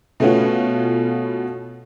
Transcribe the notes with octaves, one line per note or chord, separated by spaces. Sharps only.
B2 A3 B3 C#4 F4 F#4